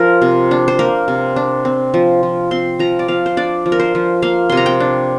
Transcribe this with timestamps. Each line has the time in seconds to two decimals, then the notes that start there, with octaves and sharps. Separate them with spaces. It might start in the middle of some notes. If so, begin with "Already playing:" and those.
Already playing: F3 A#4
0.22 C3
0.51 D4
0.68 C5
0.79 A#3 A#4
1.08 C3
1.36 D4
1.65 C4
1.94 F3
2.23 F3
2.51 C4 C6
2.79 F3 A#5
2.99 D5
3.08 F3 F5
3.26 C5
3.37 D4 D5
3.66 F3
3.72 A#4
3.80 C5
3.95 F3
4.22 A#3 F5
4.50 C3 C6
4.57 A#5
4.66 G5
4.80 D4